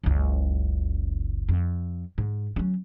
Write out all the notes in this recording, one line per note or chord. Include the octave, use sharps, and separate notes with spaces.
F#1 C#2
F2
G#2
F#3 C#4